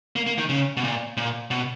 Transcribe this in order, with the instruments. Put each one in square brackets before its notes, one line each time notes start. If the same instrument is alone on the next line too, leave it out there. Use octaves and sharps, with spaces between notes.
[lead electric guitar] A#3
A#3
D#3
C#3
B2
A#2
A#2
B2